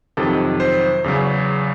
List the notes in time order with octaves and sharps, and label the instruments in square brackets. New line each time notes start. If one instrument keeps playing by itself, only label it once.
[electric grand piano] F2 C3 D#3 F#3 A4
C5
E2 C#3 F#3